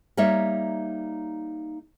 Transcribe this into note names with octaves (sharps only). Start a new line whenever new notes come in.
G3 A#3 D#4 C#5 E5